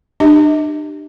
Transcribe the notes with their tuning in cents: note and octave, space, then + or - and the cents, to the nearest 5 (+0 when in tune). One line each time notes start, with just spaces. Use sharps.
D4 +40 G4 +0 D#5 +40